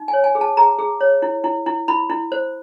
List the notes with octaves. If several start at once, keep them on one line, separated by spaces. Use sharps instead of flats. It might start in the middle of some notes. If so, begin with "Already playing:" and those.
Already playing: D#4
G#5
C#5
G#5
G#4
A5
G#4 A#5
G#4
C#5
E4
E4
E4
E4 B5
E4
C5